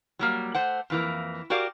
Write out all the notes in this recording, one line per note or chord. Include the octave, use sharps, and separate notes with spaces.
F#3 G3 A#3
A3 C5 F#5
F2 E3 A#3
F#4 G4 A#4 D5 F5